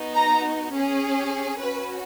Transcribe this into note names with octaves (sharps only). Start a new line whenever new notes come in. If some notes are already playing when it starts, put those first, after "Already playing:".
Already playing: B3 D#4 F#4
A#5
C#4 G#4
C#4 F#4 B4